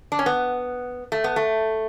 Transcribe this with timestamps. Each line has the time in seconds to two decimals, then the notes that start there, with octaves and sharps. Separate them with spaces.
0.12 D4
0.19 C#4
0.26 B3
1.12 A3
1.24 B3
1.36 A3